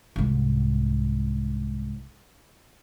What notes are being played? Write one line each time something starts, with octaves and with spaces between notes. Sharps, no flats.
C2 G#2